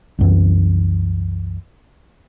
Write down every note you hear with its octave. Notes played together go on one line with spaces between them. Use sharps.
C2 F#2 E3